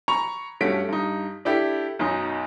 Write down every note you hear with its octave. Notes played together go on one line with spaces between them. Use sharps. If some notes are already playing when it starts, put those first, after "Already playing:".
A#5 B5 C#6 F7
G2 A3 C#4 F#4 B6 D7
G2 D#4
D4 E4 G4 A4
B1 F#2 D#4